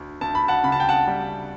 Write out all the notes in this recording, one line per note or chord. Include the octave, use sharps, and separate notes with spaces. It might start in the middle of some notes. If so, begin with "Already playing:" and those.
Already playing: D2
D2 A5
B5
F#5 A5
C#3 B5
A5
G5
F#5 A5
G3